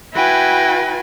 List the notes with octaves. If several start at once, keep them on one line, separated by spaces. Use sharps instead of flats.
E4 F#4 B4 G5 G#5